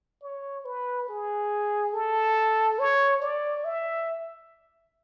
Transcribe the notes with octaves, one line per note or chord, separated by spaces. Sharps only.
C#5
B4
G#4
A4
C#5
D5
E5